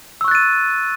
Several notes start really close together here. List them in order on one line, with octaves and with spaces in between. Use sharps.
E6 C#6 F#6 A6 D#7